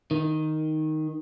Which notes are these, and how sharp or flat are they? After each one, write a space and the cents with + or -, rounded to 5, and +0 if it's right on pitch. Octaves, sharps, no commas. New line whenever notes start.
D#3 +0